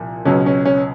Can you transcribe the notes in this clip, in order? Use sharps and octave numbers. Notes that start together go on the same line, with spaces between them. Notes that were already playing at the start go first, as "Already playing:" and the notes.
Already playing: C2 A#2 F3
C#2 B2 F#3 C#4
C#4
C#4